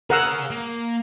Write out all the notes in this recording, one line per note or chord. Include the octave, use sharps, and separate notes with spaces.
G#4 A#4 F5 F#5 E6
A#3